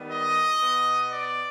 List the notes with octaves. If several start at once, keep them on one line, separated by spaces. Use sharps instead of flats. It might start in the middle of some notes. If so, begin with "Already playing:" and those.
Already playing: D#3 G3 B3
D#5
B2 B3
D5